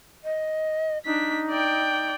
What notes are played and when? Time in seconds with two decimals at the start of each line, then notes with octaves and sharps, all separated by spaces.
0.24 D#5
1.06 D4 D#4 B6
1.50 D5 G5